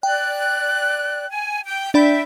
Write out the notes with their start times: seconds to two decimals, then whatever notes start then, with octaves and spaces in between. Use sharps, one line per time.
0.03 D5 G5 F#6
1.29 G#5
1.65 G5
1.94 D4 D5 E5 G5 B5